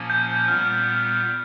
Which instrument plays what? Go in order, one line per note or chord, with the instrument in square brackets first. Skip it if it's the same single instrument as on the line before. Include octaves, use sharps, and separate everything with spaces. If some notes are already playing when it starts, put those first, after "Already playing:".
Already playing: [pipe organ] A#2 F3 A#3 C#4
[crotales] G6
[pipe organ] A#2 G3 B3 [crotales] F6